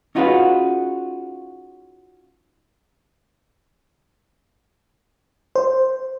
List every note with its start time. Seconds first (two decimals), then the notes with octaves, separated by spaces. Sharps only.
0.15 C#4 D#4 F4 F#4 G#4 B4
5.56 C5